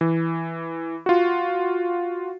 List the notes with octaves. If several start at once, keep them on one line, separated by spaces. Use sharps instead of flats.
E3
F4 F#4